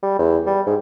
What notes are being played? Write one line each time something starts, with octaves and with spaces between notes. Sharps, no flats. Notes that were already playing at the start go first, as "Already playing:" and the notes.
G3
E2
G3
G#2